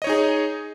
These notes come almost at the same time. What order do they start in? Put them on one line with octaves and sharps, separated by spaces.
D#5 C#5 D#4 G#4